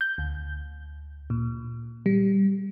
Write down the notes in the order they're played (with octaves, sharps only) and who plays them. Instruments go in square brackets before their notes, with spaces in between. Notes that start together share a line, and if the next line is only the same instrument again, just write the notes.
[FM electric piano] G6
D2
A#2
G3